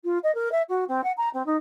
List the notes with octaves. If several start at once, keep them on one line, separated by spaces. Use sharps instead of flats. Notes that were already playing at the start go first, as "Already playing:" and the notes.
F4
D#5
A#4
E5
F#4
C4
F#5
A#5
C4
D#4